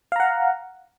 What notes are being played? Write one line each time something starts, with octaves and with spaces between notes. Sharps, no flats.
F5 F#5 A#5